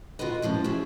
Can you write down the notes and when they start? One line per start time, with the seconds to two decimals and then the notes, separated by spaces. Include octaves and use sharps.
0.19 F4 F#4 A#4 B4 D#5
0.42 E2 A2 F3 C#4
0.64 F#4 G#4 E5